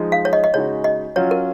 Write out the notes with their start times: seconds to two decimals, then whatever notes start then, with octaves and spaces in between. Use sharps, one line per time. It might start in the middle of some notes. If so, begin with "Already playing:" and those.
Already playing: F3 G#3 D#4 G#4
0.12 F5
0.25 C#5
0.33 D#5
0.44 D#5
0.54 C#3 G#3 D#4 F#4 C#5
0.84 D#5
1.16 F#3 C#4 F4 C#5
1.31 A#4